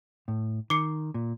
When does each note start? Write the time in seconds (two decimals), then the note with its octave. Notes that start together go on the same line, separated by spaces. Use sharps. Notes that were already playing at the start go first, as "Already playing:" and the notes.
0.28 A2
0.70 D#3 D6 C7 C#7
1.14 A#2